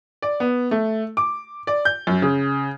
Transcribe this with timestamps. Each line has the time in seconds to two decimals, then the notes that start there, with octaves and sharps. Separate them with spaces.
0.22 D5
0.40 B3
0.71 A3
1.17 D6
1.67 D5
1.85 G6
2.07 F#2
2.22 C#3